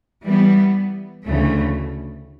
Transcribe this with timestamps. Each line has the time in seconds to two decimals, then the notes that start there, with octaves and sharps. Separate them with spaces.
0.24 E3 G3 B3
1.25 D2 C#3 E3 A3